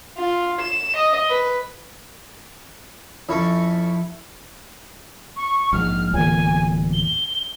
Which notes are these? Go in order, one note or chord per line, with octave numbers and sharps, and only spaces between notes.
F4
E7
D#5
B4
F2 C#4 E4 A4
C#6
A#1 G#2 F6
D1 E2 A#2 G#5
G7